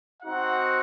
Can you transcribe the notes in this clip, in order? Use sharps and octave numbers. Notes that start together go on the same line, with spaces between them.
C4 D#4 F#4 F#5